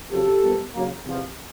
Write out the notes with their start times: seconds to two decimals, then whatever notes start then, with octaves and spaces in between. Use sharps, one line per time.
0.11 F2 C#3 F#3 G4 A4
0.43 A#2 G3 B3
0.74 C#3 F#3 A#3
1.06 E2 C3 F3